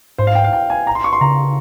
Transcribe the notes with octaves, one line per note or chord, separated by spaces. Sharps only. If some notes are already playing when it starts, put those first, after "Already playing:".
G#2 C5
F5
G5
F5
G5
G#5
A#5
C6
C#6
C6
C#3 A#5